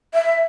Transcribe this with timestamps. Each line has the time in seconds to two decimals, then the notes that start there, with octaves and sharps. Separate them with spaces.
0.14 E5